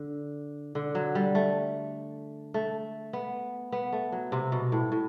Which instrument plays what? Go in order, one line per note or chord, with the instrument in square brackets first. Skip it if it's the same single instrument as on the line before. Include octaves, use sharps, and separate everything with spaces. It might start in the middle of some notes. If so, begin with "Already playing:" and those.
Already playing: [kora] D3
D3
F#3
G3
A3
A3
B3
B3
A3
F#3
C3
B2
A2
A2